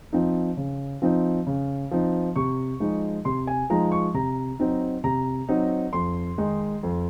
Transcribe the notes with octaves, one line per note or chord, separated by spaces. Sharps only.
F3 C4 D#4
C#3
F3 C4 D#4
C#3
F3 C4 D#4
C3 C#6
F3 G#3 D#4
C3 C6
G#5
F3 G#3 D#4 A#5
C#6
C3 A#5
F#3 C4 D#4
C3 A#5
F#3 C4 D#4
F2 C6
D#3 G#3 D#4
F2